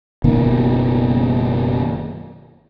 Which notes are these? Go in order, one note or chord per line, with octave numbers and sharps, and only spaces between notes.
F#1 B2 D#3 A#3